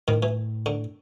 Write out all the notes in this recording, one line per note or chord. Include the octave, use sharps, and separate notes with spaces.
A2 D#3
E3
D3